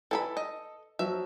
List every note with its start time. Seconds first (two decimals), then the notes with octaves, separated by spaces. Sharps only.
0.11 E3 G#4 A4 B5
0.37 D#5
0.99 F3 F#3 E5